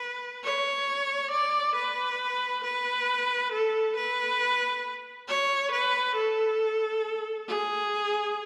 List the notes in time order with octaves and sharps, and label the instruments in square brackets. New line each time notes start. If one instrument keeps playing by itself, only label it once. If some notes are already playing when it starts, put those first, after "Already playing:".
Already playing: [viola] B4
C#5
D5
B4
B4
A4
B4
C#5
B4
A4
G#4